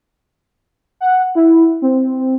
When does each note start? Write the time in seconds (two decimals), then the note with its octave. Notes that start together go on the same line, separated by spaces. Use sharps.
1.01 F#5
1.35 E4
1.82 C4